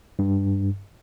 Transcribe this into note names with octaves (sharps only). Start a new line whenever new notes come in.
G2